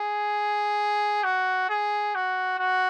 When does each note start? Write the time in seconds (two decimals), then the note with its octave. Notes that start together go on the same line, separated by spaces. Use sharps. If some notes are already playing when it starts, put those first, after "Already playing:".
Already playing: G#4
1.24 F#4
1.69 G#4
2.15 F#4
2.59 F#4